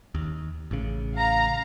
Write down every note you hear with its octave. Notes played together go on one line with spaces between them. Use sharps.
D#2
A1 C#3
F5 A#5